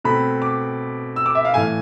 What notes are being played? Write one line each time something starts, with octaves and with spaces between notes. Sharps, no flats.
B2 A3 C4 B5
D6
E6
D6
E5
F5
A2 E3 A3 G#5